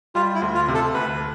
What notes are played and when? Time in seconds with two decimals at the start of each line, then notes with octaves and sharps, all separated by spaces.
0.15 G3 F4
0.35 E4
0.42 D2
0.55 F4
0.68 C3
0.74 A4
0.94 D2 B4